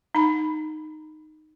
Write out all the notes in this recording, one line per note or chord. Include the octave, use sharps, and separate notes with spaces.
D#4 B5